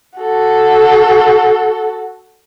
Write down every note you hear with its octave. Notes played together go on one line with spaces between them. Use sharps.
F#4 A4